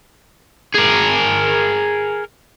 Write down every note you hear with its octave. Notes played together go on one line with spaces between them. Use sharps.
G#4 A#4